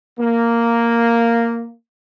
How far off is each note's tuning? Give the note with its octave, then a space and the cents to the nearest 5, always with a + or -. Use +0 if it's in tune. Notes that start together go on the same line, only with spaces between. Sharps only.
A#3 -5